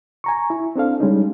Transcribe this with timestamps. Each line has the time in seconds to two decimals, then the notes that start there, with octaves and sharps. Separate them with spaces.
0.24 G#5 A#5 C#6
0.50 E4
0.76 C4 D4 A4 F5
1.00 G3 G#3 C#4 D#4